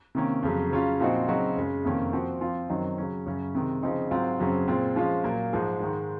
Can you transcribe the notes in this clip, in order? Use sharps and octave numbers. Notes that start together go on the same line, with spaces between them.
C3 D#3 A#3 C#4
F2 C#3 F#3
C#3 F#3 C#4 F4
A#2 F3 C4 D#4 F#4
C#3 F#3 C4 D#4 F#4
F#2 C#3 G#3
F2 C3 D#3 A#3 C#4
F3 C4 F#4
F3 C4 F4
F#2 D#3 F#3 C4 D#4
C#3 F#3 C#4
F#2 C#3 F#3 C#4
C3 D#3 G#3
C#3 F3 C4 D#4
G#2 F#3 C4 F4
F#2 C#3 F#3 C4 F#4
A#2 G#3 C4 F4
F3 G#3 C#4 F4
A#2 F#3 A#3
G#2 F3 G#3
G#2 D#3 G#3